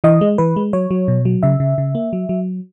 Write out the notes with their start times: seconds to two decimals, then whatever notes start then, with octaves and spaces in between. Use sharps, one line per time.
0.04 E3 D#5
0.21 G#3
0.38 E3 B4
0.56 G#3
0.73 F#3 C#5
0.91 F#3
1.08 B2
1.25 F#3
1.43 C#3 E5
1.60 C#3
1.78 C#3
1.95 A#3
2.13 F#3
2.29 F#3